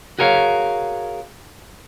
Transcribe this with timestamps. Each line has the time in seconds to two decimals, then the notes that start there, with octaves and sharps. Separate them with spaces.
0.19 F#4 G#4 A#4 C#5 F5